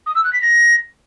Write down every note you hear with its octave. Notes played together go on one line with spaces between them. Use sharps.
D#6
E6
F#6
B6
A#6